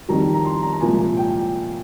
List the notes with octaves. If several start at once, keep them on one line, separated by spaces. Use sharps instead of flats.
F2 D#3 G3 A#5
A#5
C6
A#5
A#5
C2 A#2 F3 G#3 G#5
G5